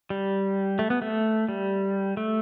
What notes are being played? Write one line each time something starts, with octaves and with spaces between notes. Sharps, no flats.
G3
A3
B3
A3
G3
A3